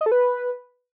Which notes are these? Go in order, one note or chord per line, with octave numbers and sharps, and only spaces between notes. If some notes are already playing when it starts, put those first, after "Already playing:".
D#5
A4
B4